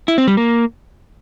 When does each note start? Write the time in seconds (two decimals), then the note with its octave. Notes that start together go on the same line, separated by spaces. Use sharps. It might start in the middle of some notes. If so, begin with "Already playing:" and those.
0.08 E4
0.18 C4
0.27 G3
0.37 A#3